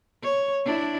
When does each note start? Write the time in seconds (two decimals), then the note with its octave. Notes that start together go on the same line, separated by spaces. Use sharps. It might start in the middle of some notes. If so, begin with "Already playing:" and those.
0.22 C#5
0.65 D4 E4